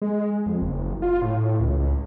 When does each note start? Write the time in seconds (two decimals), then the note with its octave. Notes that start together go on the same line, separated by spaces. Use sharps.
0.02 G#3
0.46 F2
0.62 F#1
1.02 F4
1.22 A2
1.60 C#2